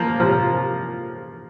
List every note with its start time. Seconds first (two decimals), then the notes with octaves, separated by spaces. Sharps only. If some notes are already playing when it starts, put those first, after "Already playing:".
Already playing: F3 A#3
0.20 C3 F3